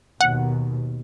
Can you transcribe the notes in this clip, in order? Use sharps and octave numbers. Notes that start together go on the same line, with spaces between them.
D#2 B2 F#5